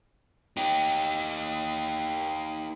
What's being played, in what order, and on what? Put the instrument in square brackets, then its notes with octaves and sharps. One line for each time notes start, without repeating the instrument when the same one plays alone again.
[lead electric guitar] D#4 G4